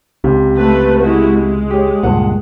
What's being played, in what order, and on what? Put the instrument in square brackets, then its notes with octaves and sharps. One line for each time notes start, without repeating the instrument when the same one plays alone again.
[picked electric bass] C#2 [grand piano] C3
[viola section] A3 B4
G#3 E4 F#4
G#3
[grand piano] G4 C#5
[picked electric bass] C#2 G2 A#2 [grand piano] F#5